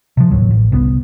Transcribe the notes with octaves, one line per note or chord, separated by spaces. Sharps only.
C3 F3
D1 A1 D#2 F#3
A1
G1 C2 B2 B3